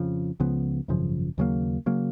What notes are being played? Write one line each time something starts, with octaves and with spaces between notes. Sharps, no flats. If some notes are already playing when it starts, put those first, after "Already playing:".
Already playing: F2 C#3 F3
C#2 C#3 F3 B3
G#1 F#2 C#3 F3
D#2 C#3 F#3 A#3
C#3 F#3 A#3